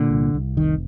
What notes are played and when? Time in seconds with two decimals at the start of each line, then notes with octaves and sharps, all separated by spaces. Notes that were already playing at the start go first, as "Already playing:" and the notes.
Already playing: A#2 D3
0.10 C2
0.34 C2
0.57 F1 D#3